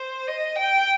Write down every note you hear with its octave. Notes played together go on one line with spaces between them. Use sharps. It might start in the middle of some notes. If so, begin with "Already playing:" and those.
Already playing: C5
D#5
G5